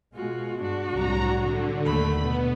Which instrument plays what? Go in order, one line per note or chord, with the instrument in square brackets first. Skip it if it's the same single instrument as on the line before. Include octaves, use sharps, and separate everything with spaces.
[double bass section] B2 G#3 [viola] F4 F#4
[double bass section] G2 [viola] D4 F#4
[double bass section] C2 A2 F#3 [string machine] A#5
[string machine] D3
[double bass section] D#2 [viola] A3 B5
[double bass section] B2 [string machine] B3